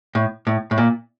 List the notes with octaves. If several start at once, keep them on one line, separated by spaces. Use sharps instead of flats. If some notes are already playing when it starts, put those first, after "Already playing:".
A2
A2
A2
A#2